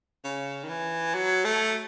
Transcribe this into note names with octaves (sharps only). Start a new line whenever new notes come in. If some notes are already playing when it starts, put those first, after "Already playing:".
C#3
D#3
E3
F#3
A3